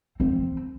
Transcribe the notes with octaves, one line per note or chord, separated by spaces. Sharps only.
C4